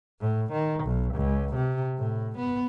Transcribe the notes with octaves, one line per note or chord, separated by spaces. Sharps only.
A2
D#3
B1
C#2
C3
A2
B3